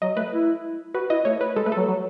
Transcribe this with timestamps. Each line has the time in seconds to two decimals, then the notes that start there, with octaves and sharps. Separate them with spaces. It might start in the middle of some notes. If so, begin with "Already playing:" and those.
0.02 F#3 D#5
0.17 A3 B4
0.32 E4
0.95 F#4 B4
1.10 E4 D#5
1.25 A3 C#5
1.41 B4
1.56 G#3 A4
1.66 A3 B4
1.72 F#3 A4
1.88 F#3